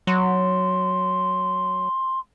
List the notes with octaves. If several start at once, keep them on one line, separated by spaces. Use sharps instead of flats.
F#3 C6